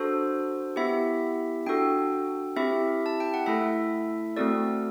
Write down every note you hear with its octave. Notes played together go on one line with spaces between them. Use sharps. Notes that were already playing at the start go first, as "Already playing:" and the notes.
Already playing: D4 F#4 A4 C5
B3 E4 G4 E5
D4 F#4 A4 G5
C4 E4 G4 E5
A5
G5
F#5
A3 E4 A4 E5
A3 C4 F#4 A4 D5